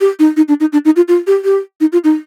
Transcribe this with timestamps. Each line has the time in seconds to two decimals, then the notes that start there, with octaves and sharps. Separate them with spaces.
0.01 G4
0.19 D#4
0.37 D#4
0.48 D4
0.60 D#4
0.73 D4
0.85 D#4
0.96 F4
1.08 F4
1.27 G4
1.45 G4
1.81 D#4
1.93 F4
2.04 D#4